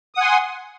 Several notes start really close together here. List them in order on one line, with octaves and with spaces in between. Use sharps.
D#6 F#5 G#5 C6